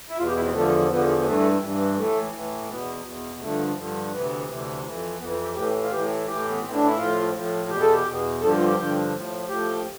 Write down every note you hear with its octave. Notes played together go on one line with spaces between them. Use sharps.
E4
E2 B2 F4
G4
E4
C4
E2 D3 F3 A3
E2 D3 F3 B3
B3
G2 E3 A3
G2 E3
A2 E3 A3
A2 E3
E2 B2 B3
E2 B2
G2 D3 F3 A3
G2 D3 F3
D2 C3 E3 B3
D2 C3 E3
F2 E3
F2 E3 B3
C4
G4
A2 E3 G4
F4
A2 E3 G4
A2 E3 G4
B3
A2 E3 C4
D4
E4
A2 F3 F4
A2 F3
E2 B2 G4
A4
G4
E2 B2
G2 D3 F3 A4
G4
F4
G4
G2 D3 F3
A2 F3
A2 F3 G4